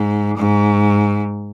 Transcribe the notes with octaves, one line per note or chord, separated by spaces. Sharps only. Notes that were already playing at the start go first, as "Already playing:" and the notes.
Already playing: G#2
G#2